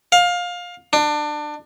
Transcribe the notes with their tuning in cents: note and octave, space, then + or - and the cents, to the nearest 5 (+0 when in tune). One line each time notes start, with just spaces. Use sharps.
F5 +20
D4 +25